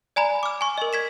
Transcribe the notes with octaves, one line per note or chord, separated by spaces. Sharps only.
D5 G#5 A#5 B5
D6 F6
G#5 C#6
A#4 D#5
G#6 B6 E7